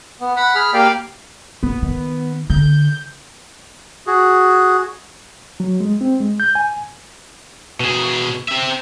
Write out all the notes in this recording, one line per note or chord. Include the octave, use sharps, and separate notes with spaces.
B3
F#5 B5
G#4 B5 F6
A#3 G4 D5 F5 G5
F#1 B3
D#3
D3 G6
F#4 G#4
F#3
G#3
C4
G#3
G6
G#5
B2 G#4
C4 E5